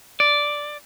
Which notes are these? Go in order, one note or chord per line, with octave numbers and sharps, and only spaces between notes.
D5